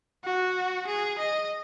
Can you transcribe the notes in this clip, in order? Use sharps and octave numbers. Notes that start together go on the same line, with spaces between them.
F#4
G#4
D#5